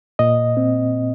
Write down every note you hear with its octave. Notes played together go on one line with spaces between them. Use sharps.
A#2 D#5
C4